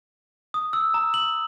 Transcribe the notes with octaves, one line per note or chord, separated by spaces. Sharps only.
D#6
E6
A#5
F#7